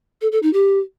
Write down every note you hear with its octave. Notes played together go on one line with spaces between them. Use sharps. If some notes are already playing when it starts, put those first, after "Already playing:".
A4
A4
D#4
G4